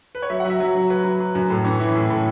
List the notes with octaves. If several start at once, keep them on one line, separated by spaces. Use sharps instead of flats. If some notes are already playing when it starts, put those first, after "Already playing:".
B4
C#5
F#3 E5
F#5
F#3
E5
F#3 E5
F#3
F#3 B4
F#3
F#3
F#2
A2 A4
E3 C#4
E3 E4
A2
A2 A4